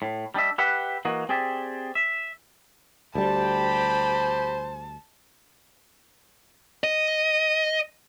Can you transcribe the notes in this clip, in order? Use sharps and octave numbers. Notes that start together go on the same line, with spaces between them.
A2
G3 D4 D#5 E5
G4 B4 E5 F#5
E3 A#3 F#4 D#5
C4 G4 G#4 D5 E5
E5
D2 G3 G4 C5 G5 A5 B5
D#5